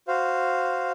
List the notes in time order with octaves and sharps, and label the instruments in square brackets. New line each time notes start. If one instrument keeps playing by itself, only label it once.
[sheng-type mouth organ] F#4 C5 F5